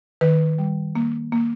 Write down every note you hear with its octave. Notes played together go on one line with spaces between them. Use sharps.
D#3 B4
G3
A#3
A#3